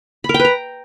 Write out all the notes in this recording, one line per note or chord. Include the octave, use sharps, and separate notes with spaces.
B5
A#4
G5
B4
A#5